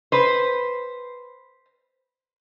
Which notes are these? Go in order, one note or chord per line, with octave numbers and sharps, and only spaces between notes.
B4 C5